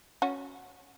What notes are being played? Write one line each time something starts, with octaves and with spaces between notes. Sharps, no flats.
C#4 F#4